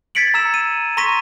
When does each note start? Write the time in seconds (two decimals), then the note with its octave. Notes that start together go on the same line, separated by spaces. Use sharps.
0.15 G#6 A6 B6 C#7 D7 F#7
0.34 A#5 E6 E7
0.54 D#7
0.97 A#5 C6 C#6 A#6 B6 D#7